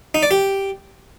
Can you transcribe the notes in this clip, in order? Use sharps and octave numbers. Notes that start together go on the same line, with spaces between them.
D#4
D5
G4